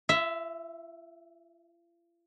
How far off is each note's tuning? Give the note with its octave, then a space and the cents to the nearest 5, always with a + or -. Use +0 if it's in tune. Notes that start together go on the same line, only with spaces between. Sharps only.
F4 -45 E5 +0